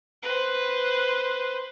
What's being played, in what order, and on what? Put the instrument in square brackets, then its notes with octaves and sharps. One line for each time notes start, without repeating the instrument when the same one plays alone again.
[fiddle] B4 C5